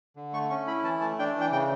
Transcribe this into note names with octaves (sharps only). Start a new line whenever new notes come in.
D3
A3 C#6
C#4 C#6
E4 B5
E3 A5
A3 A5
D4 G5
E3
G5
C#3 G5